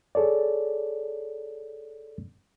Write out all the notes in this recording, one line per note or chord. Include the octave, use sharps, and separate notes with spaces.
G#4 A4 C#5 D5